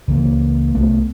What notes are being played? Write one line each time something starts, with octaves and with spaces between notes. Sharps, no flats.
C#2 E3 F3 A#3
C2 A3 B3